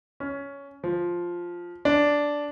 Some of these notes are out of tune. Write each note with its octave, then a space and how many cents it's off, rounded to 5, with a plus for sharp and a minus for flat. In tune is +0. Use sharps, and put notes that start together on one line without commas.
C#4 +10
F3 +0
D4 -5